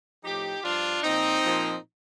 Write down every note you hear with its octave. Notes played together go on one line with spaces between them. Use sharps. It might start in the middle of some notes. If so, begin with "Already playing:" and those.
A2 F3 D#4 G4
G2 F3 D4 F4
A#2 F3 C4 D#4
A#2 F3